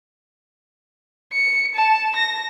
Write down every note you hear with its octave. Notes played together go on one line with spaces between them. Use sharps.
C#7
A5
A#6